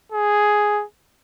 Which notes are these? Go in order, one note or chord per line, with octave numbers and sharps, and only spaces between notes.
G#4